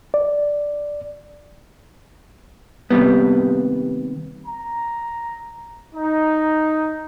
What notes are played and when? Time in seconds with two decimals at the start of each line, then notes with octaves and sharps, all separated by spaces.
0.14 D5
2.90 D#2 C3 G3 B3
4.46 A#5
5.94 D#4